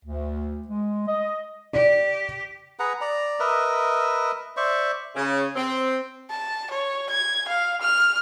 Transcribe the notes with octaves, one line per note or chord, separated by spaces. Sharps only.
D2
G#3
D#5
G4 D5
G#4 B4 F#5 A#5
D5 A#5
A#4 B4 D#5 E5
C5 D5 E5 C#6
C#3
C4
A5
C#5
G#6
F5
F6